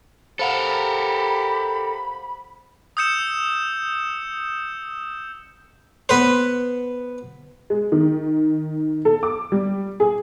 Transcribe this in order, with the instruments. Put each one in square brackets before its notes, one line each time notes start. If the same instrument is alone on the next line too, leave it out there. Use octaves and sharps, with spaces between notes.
[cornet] G4 [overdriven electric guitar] A4 A#4 [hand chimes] C5 F5 F#5 [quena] B5
[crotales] D#6 E6 G6 C#7 E7
[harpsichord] B3 B4 C5
[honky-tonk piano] G#3
D#3
A4
D6
G3
G#4